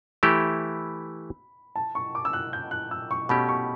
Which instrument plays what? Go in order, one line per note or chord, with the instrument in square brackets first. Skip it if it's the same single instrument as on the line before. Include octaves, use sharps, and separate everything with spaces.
[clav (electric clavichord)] E3 A3 E4 G4 [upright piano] B5
[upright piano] A5
C#6
D6
E6
F#6
G6
F#6
E6
C#6
[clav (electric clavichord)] B2 A3 C#4 G4 [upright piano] B5
[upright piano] C#6